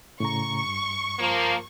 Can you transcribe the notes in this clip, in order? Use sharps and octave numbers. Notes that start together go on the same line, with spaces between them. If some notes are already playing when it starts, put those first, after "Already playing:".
A2 C#3 A#5 C#6
G2
F3 A#3